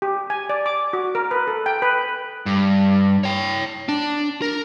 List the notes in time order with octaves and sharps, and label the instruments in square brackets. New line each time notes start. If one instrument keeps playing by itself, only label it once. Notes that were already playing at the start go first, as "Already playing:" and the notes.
[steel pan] G4
G#5
D5
D6
F#4
A#4
B4
A4
G5
B4
[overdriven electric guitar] G2
C#5 G5
D4
A#4